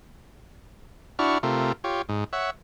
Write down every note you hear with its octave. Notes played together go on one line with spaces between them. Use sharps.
D4 E4 F#4 C#6 F6
C3 A3 F4 A#4
F4 G4 C#5
G#2
C#5 E5 F#5